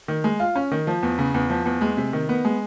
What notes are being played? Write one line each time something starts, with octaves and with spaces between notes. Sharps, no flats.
D#3
G#3
F4
C#4
D#3
F3
E2
C#3
E2
F3
E2
G#3
C3
D#3
B3
G#3